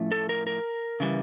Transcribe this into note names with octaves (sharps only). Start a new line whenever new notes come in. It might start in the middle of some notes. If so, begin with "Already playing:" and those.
Already playing: A2 F3 A3 C#4
A4
A#4
A#4
C#3 E3 G3